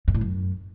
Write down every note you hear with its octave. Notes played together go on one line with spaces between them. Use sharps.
G2
A2
F#2